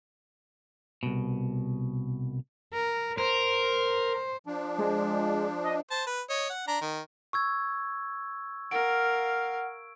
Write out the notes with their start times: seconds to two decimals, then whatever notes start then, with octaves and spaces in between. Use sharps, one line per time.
1.03 C2 B2
2.73 A#4
3.18 A#4 C5
4.47 F3 D4
4.78 G#3
5.63 D#5
5.91 C5 A5
6.07 B4
6.30 C#5 D#5
6.49 F#5
6.67 D4 A#5
6.82 D#3
7.33 C#6 E6 G#6
8.71 A#4 F5 F#5 D7